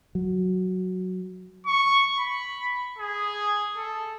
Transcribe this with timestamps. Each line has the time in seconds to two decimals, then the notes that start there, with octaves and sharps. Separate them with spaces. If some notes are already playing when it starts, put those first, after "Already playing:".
0.15 F#3
1.66 C#6
2.17 B5
2.98 G#4
3.77 A4